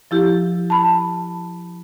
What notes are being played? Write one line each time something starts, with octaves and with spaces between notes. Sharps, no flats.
F3 E4 G4
A5 B5